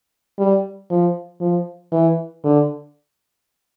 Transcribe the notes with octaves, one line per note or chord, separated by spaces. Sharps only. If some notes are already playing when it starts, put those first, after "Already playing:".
G3
F3
F3
E3
D3